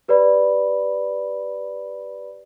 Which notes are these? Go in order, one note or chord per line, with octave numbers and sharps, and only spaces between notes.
G4 B4 C#5 D5 B5